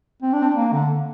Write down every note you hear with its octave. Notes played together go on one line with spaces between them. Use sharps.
C4
D4
C4
D4
A#3
D3